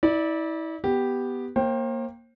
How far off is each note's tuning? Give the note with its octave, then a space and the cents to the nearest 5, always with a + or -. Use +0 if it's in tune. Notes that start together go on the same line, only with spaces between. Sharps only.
E4 -35 D5 +0
B3 +0 G4 +0
A#3 +0 C5 +40 G5 +0